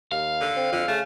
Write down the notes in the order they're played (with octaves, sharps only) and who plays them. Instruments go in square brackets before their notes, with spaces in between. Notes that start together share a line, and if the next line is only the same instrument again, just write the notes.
[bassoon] D#2 [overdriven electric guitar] F5
[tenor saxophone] D3
[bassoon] C4
[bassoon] F2 [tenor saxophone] D3
[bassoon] C#3 [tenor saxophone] A3